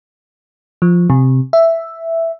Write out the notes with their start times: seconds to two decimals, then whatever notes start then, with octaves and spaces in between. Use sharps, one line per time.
0.82 F3
1.10 C3
1.53 E5